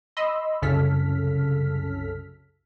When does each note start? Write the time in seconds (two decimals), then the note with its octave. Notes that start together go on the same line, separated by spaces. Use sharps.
0.17 D#5 B5 C6 E6
0.62 C2 F#2 C#3 A4 F6 B6